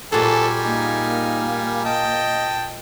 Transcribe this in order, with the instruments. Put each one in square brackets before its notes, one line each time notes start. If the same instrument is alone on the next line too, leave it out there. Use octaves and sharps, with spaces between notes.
[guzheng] A#2 F#4 G#4 [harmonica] G3 G#5 [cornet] A4
[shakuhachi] A#3 [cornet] D#4
[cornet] D#5 [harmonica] G5 A5